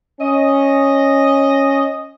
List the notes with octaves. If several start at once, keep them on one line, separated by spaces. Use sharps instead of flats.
C#4 D#5